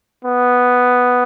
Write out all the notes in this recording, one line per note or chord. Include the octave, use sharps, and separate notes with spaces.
B3